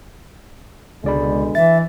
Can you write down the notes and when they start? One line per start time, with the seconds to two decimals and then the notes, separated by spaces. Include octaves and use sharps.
1.04 C#2 B2 D3 G#3 D5 B5
1.55 E3 E5 A6